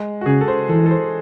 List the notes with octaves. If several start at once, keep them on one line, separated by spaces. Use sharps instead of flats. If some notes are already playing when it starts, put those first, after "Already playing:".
Already playing: G#3
F#4
C#3 G#4
A4
C5
E3 A4
A4
C5